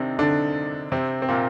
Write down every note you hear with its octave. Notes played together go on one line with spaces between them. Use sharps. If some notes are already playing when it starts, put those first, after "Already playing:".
Already playing: C3 D#3 C4 D4 D#4
D3 D4
C3 C4
C4
A#2 A#3